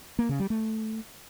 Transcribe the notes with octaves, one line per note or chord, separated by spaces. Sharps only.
A#3
C#3
G3
A3